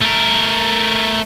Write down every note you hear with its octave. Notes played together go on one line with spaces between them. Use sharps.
A3 A#4